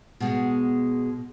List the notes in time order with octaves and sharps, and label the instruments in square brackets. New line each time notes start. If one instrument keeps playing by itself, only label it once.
[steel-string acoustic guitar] B2 G#3